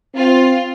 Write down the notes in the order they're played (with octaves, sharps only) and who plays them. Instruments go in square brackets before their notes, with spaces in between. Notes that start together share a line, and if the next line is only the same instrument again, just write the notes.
[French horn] C4 [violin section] F4